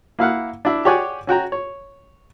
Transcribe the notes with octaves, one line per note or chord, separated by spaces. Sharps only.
A#3 E4 F5 F#5
D4 E4
G4 G#4 C#5 D5 F#5 G#5
C#4 F#4 G5 A#5
C#5